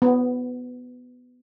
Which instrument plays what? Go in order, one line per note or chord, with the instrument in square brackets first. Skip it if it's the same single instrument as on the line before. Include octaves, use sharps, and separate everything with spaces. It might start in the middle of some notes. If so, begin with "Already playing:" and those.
[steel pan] B3